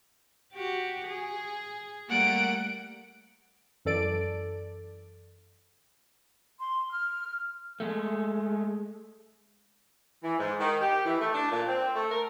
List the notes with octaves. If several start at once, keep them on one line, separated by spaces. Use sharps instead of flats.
F#4 G4
G#4
G3 A3 A#3 F#5 D7
F#2 E3 A4 D5 D7
C6
F6
G#3 A3
E3
G#2
D#3
G4
E3
A3
D4
A#2
C4
A3
A#4